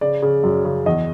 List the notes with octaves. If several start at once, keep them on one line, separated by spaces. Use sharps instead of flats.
C#3 D5
C#3
F#2
C#3
E2 D#5